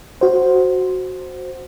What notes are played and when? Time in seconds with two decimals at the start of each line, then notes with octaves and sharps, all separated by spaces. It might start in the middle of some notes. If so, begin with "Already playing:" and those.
0.21 F#4 C5